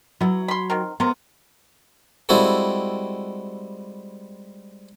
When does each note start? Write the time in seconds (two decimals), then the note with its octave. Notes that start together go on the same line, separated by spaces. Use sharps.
0.21 F#3 B3 E4
0.48 B5 C6
0.70 D#3 C4 A#4
1.00 C3 B3 A#4 C5
2.29 G3 G#3 C4 E4 F#4 A4